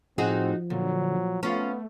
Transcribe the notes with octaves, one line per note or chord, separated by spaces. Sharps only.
A2 F3 C4 D#4 F#4 G#4
A#2 D3 F#3
A3 B3 C#4 F4